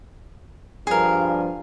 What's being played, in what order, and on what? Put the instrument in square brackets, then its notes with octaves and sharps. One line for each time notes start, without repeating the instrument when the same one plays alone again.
[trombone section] G2 F3 [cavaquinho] G#4 A#4